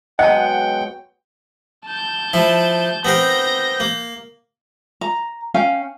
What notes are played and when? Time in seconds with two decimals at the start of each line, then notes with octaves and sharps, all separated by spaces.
0.19 B2 F#3 G#3 D#5 F#5 G5 A5
1.86 A5 G6
2.33 F3 E4
3.05 B3 C4 A#4 G6 A#6
3.80 A#3
5.01 A#5
5.54 C#4 F5 G5 G#5